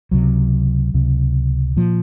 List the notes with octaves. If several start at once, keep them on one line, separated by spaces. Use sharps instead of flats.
C#2 C3 F#3
C#2 C3
A#2 F3